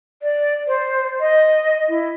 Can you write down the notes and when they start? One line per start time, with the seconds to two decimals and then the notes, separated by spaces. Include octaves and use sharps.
0.22 D5
0.68 C5
1.20 D#5
1.89 E4